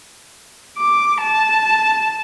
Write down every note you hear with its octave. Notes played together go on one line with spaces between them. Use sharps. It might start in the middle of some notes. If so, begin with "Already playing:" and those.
D6
A5